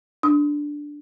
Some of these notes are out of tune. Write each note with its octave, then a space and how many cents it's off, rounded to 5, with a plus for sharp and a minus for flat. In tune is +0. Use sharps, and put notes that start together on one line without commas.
D4 +0 D#6 +30